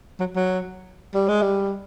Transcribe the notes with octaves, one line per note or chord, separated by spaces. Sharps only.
F#3
F#3
G3
G#3
G3